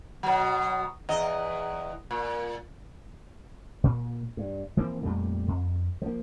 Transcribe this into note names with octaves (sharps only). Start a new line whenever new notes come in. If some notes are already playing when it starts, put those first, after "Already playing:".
B2 F#3
E2 D#5
A#2
A#2
G2
E3 F3 A#3 C4
F2 A#2 G3 A3
F2
F3 A#3